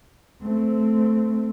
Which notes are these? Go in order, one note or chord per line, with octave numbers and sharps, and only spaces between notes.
A3 C4